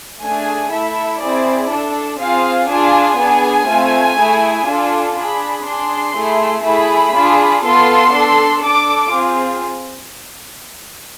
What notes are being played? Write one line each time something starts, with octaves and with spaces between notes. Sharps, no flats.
A3 D4 G#4 G#5
A3 E4 A4 E5
C4 E4 G#4 D5
D4 A4
C4 F4 G#4 F5
D4 F4 G#4 G#5
B3 D4 G#4 G#5
A3 C4 F4
A3 E4 G#4
D4 F4 A4
D4 G#4 B5
D4 G#4 C6
A3 E4 G#4
A3 E4 G#4 B5
D4 F4 G#4
B3 F4 A4 C6
D4 A4
D4 A4 D6
C4 F4 G#4